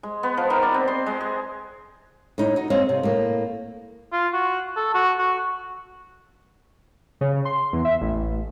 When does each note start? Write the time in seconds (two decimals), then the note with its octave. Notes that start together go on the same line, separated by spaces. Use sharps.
0.03 G#3
0.23 B3
0.37 F3
0.50 D#3
0.62 D5
0.74 C4
0.88 C6
1.06 G#3
1.21 G#4
2.38 A2 D#4 E4
2.56 D#4 F#4
2.70 C4 C#5 D#5 F5
2.89 C3
3.03 A2 A#3
4.13 F4
4.34 F#4
4.77 A4
4.94 F#4
5.19 F#4
7.21 C#3
7.45 C6
7.73 E2
7.85 E5
8.01 A1